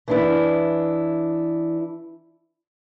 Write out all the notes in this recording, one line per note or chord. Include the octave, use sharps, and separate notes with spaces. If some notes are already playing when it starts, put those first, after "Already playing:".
E3 D4 E4